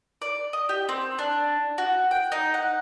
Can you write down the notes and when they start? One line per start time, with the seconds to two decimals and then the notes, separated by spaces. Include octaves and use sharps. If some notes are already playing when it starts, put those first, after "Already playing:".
0.22 D5
0.53 D#5
0.69 G4
0.89 C4
1.19 D4
1.78 F#4
2.11 G5
2.32 D#4
2.54 F#5